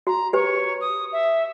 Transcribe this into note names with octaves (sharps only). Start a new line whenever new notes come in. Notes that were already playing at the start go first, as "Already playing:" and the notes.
F#4 A#5
G4 B4 C#5
D#6
E5